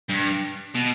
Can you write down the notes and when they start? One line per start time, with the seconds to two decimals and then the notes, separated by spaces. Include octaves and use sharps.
0.09 G2
0.75 B2